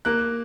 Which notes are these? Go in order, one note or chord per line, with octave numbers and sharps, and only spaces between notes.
A#3 F#6